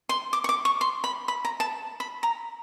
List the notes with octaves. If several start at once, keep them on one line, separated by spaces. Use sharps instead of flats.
C6
D6
C#6
D6
C#6
C6
B5
B5
A#5
A5
B5
A#5